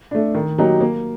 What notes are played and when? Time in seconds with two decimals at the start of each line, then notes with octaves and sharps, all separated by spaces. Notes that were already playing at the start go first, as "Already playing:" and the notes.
0.11 A3 D4
0.35 D#3
0.58 F#3 A#3 D#4 G4
0.81 A#3